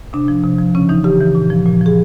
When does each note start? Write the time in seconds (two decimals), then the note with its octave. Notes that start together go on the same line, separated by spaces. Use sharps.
0.13 C3 D4
0.28 F3
0.43 C3
0.58 F3
0.75 C#3 C#4
0.89 E3 D#4
1.04 C#3 G4
1.21 E3
1.35 A#2
1.50 F3
1.65 A#2
1.81 F3 G#4